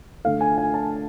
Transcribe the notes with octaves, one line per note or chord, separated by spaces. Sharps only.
D3 A3 F5
G#5
G#5
A5